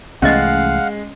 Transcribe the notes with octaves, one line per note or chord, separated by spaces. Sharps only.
C2 E3 G#3 A3 C#4 D#5 F5 F#5